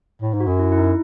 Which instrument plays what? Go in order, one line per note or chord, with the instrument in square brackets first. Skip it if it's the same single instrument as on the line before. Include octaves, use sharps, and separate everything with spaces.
[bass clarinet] A2
G#2
[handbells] F#4
[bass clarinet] F#2
[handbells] E4
E4
D#4